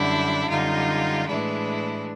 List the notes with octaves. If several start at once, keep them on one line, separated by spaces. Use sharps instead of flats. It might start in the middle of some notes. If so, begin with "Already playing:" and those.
Already playing: F#2 D3 G3 D4 E4
F#2 D3 G3 D#4 F4
A2 E3 G#3 D4 E4